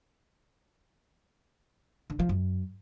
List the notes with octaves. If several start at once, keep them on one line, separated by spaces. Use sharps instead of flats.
D3
F3
F#2